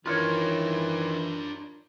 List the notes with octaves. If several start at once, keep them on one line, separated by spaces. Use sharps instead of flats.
D#3 E3 D4 F4 A#4 B4 C#5